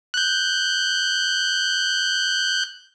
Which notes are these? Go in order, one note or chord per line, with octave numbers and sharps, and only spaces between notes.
F#6 G6